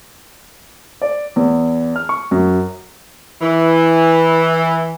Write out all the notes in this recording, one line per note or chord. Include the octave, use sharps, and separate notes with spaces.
D5
E2
F6
C#6
F#2
E3